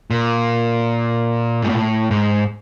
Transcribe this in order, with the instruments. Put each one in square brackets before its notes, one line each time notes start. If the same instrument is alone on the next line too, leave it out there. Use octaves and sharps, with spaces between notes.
[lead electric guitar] A#2
G#2
A2
G#2